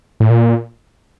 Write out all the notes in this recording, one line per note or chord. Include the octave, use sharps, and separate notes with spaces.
A2
A#2